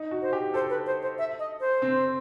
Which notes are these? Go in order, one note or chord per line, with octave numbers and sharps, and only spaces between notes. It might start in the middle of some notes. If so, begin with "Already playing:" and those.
Already playing: D#4
F#4
C5
G4
A4 C5
B4
C5
C5
E5
D#5
C5
C4